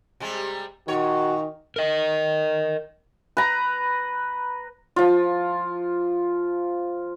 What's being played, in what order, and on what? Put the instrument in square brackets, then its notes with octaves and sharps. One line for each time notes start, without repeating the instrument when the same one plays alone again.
[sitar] C3 G3 G#3
[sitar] A#2 C#5 [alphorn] D#3 [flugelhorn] F#4
[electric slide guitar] A#4 D#5
[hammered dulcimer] B4 A#5
[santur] F3 F4